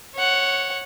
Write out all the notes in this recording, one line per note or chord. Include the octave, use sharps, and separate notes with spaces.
C#5 F#5